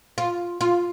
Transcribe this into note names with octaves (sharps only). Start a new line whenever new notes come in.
F4
F4